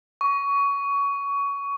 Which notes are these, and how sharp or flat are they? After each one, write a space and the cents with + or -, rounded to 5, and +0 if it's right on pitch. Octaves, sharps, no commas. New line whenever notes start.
C#6 +20